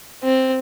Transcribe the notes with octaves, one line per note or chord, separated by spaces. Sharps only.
C4